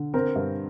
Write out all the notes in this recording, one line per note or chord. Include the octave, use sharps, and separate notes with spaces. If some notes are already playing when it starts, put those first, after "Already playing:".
Already playing: D3
C4 A#4
G2